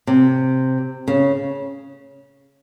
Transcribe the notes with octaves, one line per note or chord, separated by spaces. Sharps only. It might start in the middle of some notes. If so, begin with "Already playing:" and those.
C3
C#3